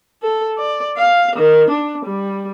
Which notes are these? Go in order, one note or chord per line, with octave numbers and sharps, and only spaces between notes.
A4
D5
F5
D#3
D4
G3